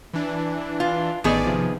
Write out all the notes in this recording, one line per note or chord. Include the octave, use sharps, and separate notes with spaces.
E3 D4
F4
A1 D#3 B3 G#4 D5
C3 F3